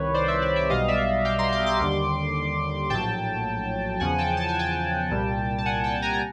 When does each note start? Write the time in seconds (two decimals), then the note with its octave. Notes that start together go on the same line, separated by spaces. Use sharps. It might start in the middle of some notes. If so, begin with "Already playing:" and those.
Already playing: C2 C3 D#3 B4 C#5
0.14 C5 D5
0.28 D5 E5
0.42 D5 E5
0.56 D5 E5
0.70 B1 B2 G3 D#5 F5
0.88 D5 E5
1.25 F5 G5
1.38 A#5 C6
1.52 C6 D6
1.66 C6 D6
1.80 D#2 D3 G3
2.90 A#1 A2 F#3 G5 A5
4.00 E2 C#3 F3 F#5 G#5
4.18 G5 A5
4.37 A5
4.49 G#5
4.59 G5 A5
5.11 C2 A#2 G3
5.59 A5
5.66 F#5 G#5
5.84 G5 A5
6.02 G#5 A#5
6.14 A#5